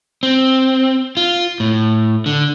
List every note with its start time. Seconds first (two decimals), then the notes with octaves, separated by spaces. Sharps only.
0.23 C4
1.17 F4
1.60 A2
2.26 D3